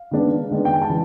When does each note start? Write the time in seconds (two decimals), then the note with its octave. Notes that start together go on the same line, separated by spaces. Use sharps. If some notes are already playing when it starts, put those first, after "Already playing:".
Already playing: F5
0.11 D#3 G#3 B3 D4
0.51 D#3 G#3 B3 D4
0.65 G5
0.73 G#5
0.82 A5
0.89 E3